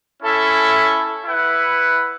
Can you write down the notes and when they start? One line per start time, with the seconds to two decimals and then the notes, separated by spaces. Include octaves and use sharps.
0.22 C#4 E4 A4 E5
1.24 E4 B4 F#5